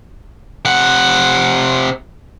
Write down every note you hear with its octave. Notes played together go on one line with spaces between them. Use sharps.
C3 F#5